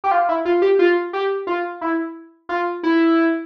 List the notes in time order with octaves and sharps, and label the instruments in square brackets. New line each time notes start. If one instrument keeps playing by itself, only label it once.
[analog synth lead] G4
F4
E4
F4
G4
F4
G4
F4
E4
F4
E4